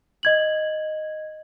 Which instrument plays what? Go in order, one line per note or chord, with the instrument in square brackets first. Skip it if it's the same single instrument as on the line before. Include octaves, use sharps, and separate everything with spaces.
[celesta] D#5 G#6 F#7